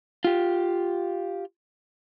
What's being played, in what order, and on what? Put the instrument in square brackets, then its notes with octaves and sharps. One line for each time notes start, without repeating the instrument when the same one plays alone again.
[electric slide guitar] F4 G4